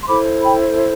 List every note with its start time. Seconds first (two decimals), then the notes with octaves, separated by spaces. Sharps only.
0.03 C6
0.07 E4 A4 C5 B5 D6
0.42 G5 B5